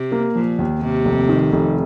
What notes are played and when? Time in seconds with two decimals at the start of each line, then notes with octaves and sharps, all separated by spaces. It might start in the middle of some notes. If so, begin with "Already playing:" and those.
Already playing: C3
0.12 A#3
0.35 A#2 F3
0.59 D#2
0.82 D#2 C3
1.05 F1
1.29 D#3
1.52 F1